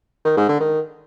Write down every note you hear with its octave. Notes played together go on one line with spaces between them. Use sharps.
D#3
G#2
D3
D#3